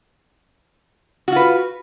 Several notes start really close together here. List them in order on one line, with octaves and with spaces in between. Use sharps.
F#4 F4 B4